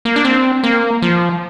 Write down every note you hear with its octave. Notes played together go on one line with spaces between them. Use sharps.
A#3
D4
C4
A#3
F3